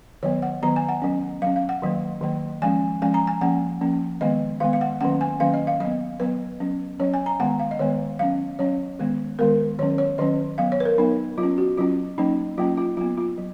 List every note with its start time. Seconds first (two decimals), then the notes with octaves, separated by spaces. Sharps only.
0.23 D#3 F#3 B3 C#5
0.42 F#5
0.62 D#3 F#3 B3 A#5
0.76 G#5
0.89 F#5
1.02 F#3 C#4
1.42 F#3 F5
1.47 C#4
1.56 F5
1.69 F#5
1.82 D#3 F#3 A#3
2.21 D#3 F#3 A#3
2.62 F3 G#3 C#4 G#5
3.02 F3 G#3 C#4 G#5
3.14 A#5
3.27 G#5
3.41 F3 A#3 C#4 F#5
3.81 F3 A#3 C#4
4.21 D#3 G#3 B3 D#5
4.60 D#3 G#3 B3 F5
4.73 F5
4.81 F#5
5.01 D#3 F#3 A#3 C#4 F#5
5.21 G#5
5.40 D#3 F#3 A#3 C#4 F5
5.54 D#5
5.67 F5
5.80 F#3 B3 D#5
6.20 F#3 B3 B4
6.60 F#3 C#4
6.99 F#3 C#4 C#5
7.14 G#5
7.26 A#5
7.40 D#3 G#3 B3 F#5
7.60 F5
7.71 D#5
7.79 D#3 G#3 B3 C#5
8.19 F#3 C#4 F5
8.59 F#3 C#4 C#5
8.99 D#3 G#3 B3
9.39 D#3 G#3 B3 A#4
9.79 D#3 F#3 C#4 C#5
9.98 C#5
10.18 D#3 F#3 C#4 D#5
10.58 F#3 B3 F5
10.72 C#5
10.80 B4
10.85 A#4
10.98 F#3 B3 D#4
11.38 F#3 F4
11.43 C#4
11.58 F#4
11.78 F#3 C#4 F4
12.18 F#3 A#3 C#4 D#4
12.58 F#3 A#3 C#4 F4
12.77 F4
12.97 F#3 B3 F4
13.17 F4
13.38 F#3